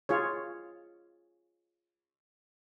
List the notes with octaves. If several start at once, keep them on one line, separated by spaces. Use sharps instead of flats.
F4 G#4 C#5